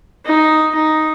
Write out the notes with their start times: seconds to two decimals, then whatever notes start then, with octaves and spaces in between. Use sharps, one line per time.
0.25 D#4
0.75 D#4